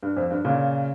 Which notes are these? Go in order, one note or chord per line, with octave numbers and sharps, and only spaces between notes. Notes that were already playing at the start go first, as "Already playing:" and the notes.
G2
F2
G2
A#2 C#3